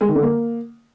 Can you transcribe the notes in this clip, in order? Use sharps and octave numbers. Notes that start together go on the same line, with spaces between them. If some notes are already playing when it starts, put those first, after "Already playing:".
G#3
D#3
D3
A#3